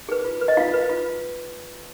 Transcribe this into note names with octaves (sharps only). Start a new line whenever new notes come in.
G#4 B4
F4
B4
D#5
F4 F5
B4
F4